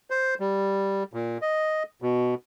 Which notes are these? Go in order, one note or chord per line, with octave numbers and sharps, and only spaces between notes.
C5
G3
A#2
D#5
B2